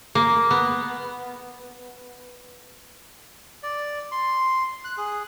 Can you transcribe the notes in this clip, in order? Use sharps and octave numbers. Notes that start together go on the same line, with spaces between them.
A#3
B3
D5
C6
F#6
G#4